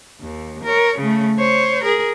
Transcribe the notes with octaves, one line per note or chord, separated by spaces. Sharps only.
D#2
A#4 C#5
C#3 A3
C5 C#5
G#4 A#4